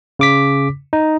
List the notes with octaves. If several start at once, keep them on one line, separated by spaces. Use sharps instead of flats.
C#3 D6 B6
D#4